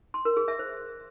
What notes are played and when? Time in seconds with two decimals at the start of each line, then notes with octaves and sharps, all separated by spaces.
0.14 C6
0.25 A#4
0.37 G#4
0.48 E5
0.59 C5